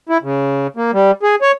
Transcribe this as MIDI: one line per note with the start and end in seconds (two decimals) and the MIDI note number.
0.09 0.18 64
0.23 0.67 49
0.76 0.91 58
0.93 1.11 55
1.23 1.35 68
1.42 1.52 73